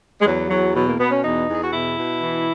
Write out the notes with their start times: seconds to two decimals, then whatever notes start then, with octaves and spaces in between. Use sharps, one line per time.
0.21 G#3
0.25 E2 F#3
0.50 E2 F#3
0.74 B2 F#3
0.87 A#3
0.98 B2 B3
1.11 C#4
1.23 E2 D#4
1.48 E2
1.53 G#4
1.63 F#4
1.72 B2 E4
1.97 B2
2.22 E3